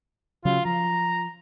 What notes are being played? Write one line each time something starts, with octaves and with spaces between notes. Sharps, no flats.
C#3 F#3 F4
F3 A#5